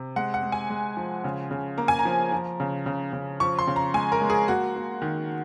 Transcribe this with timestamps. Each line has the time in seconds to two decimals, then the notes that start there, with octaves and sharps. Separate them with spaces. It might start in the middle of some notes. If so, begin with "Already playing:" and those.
Already playing: C3
0.16 G#3 F#5
0.34 F#5
0.43 G#3
0.52 G#5
0.70 G#3
0.97 F3
1.24 C#3
1.51 C#3
1.78 A#3 A#5
1.88 G#5
1.99 A#5
2.05 F3
2.32 F3
2.60 C#3
2.86 C#3
3.13 C#3
3.40 F3 C#6
3.59 C6
3.67 C#3
3.76 A#5
3.94 G#3 G#5
4.12 A#4
4.21 G#3
4.30 G#4
4.48 A#3 F#4
4.76 A#3
5.02 D#3